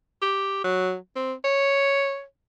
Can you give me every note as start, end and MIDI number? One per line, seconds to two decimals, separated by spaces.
0.22 0.59 67
0.64 0.95 54
1.16 1.33 60
1.44 2.23 73